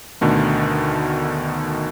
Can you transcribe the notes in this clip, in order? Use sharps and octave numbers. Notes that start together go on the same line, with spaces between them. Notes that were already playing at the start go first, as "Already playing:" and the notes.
D2 B2 D3 D#3 A3